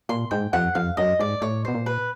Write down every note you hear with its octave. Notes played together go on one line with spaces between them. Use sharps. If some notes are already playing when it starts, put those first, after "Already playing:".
A#2 C6
G#2 G5
F2 F#5
F2 F5
F#2 D#5
G#2 D5
A2 C#5
B2 C5
A#2
B4